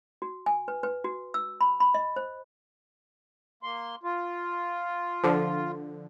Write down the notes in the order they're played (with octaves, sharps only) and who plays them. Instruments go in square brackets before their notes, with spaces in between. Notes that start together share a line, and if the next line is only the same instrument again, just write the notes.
[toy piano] F#4
G#5
B4
B4
F#4
E6
B5
B5
D#5
C5
[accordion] A#3 C6
F4
[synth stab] D3 F3